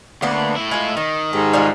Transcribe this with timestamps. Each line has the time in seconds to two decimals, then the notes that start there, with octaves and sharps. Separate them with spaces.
0.22 D2 A#3 B3 D4
0.56 A2 E4
0.71 G#3 F4
0.97 D#3 D#4
1.33 G#2 G4 A4
1.53 G3 G#3 F4